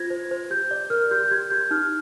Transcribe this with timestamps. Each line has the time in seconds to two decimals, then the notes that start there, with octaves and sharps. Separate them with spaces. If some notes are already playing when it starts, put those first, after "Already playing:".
Already playing: F4 C5 G#6 A#6
0.10 C5
0.31 C5
0.50 G4 G6
0.71 D5
0.90 A#4 F6
1.11 G4 G6
1.24 G6
1.31 G4 G#6
1.50 G4 G6
1.71 D#4 F6